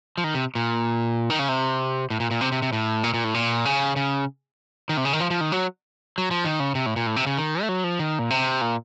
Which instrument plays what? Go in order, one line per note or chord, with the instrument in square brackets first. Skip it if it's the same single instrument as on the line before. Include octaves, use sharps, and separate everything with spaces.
[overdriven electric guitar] F3
D#3
C3
A#2
D#3
C#3
C3
A2
A#2
A#2
C3
C3
C3
A2
A#2
A#2
A2
A#2
C#3
C#3
D#3
C3
C#3
D#3
F3
F3
D#3
F#3
F#3
F3
D#3
C#3
C3
A2
A#2
A2
C3
C#3
D#3
A3
F#3
F3
D#3
A#2
C3
A#2